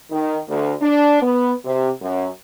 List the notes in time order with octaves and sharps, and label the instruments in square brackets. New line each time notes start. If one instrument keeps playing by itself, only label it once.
[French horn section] D#3
D2
D4
B3
C3
F#2